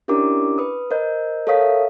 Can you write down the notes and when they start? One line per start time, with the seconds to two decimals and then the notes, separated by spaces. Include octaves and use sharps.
0.08 C#4 D4 E4 G4 A#4 D6
0.58 B4 D#6
0.91 A#4 C5 D#5 G6
1.47 A4 A#4 C#5 F5 D#6 B6
1.61 E5